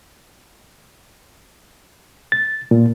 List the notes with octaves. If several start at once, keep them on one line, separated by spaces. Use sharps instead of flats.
A6
A#2